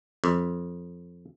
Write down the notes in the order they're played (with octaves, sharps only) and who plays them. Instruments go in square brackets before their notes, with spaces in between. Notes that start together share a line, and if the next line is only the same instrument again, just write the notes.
[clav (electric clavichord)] F2